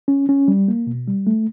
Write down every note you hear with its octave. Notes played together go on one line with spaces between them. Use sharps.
C#4
C#4
G3
A#3
B2
G3
A3